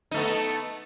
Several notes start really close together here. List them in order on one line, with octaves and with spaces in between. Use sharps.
D#4 A3 B3